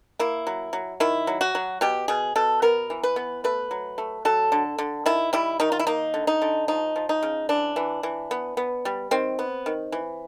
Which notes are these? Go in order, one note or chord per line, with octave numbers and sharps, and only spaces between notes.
A#3 E4
F#3
F#3
D#3 E4
F#3
F#4
F#3
B2 G4
B2 G#4
B2 A4
B3 A#4
E3
B4
B3
A3 B4
F#3
A3
F#3 A4
D3
D3
D#3 E4
G3 E4
D#3 D#4
F4
E4
A#3 D#4
D3
D#4
D3
F3 D#4
F3
D#4
C#3
E3 D4
E3
E3
B3
B3
G3
D#3 C4
B3
D#3
E3